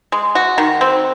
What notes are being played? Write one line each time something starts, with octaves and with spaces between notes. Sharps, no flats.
G#3
F#4
D#3
C4